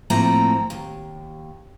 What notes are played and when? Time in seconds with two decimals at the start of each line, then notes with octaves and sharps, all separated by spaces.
0.10 A2 F3 A3 A#3 C4 A#5
0.70 D#2